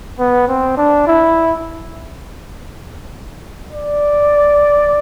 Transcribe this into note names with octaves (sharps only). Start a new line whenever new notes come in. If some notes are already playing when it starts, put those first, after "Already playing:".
B3
C4
D4
E4
D5